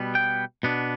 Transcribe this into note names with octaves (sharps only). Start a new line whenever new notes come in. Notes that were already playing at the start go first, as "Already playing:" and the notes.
Already playing: B2 G3 B3
G5
B2 B3 D4